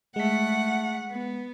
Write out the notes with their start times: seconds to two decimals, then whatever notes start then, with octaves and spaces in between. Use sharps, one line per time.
0.16 G#3 A3 F#5 B6
1.11 B3